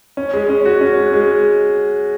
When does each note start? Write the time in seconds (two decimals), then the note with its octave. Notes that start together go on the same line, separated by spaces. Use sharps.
0.17 C#4
0.34 G#3
0.49 C#4
0.65 F#4
0.81 C#4
0.98 G#3
1.13 G#3